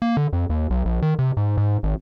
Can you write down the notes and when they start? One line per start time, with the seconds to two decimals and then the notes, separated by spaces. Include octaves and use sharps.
0.02 A#3
0.17 D3
0.33 F2
0.50 D#2
0.70 B1
0.85 A#1
1.02 D#3
1.19 C3
1.37 G#2
1.57 G#2
1.83 G#1